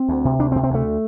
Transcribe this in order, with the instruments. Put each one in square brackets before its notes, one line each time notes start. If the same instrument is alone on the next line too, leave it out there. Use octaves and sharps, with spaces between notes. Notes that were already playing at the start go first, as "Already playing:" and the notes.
Already playing: [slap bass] C4
D2
C3
D2 D4
C4
C3
C4
D2 A3